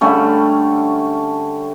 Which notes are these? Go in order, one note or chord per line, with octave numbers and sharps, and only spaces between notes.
D3 G3 A3 C#4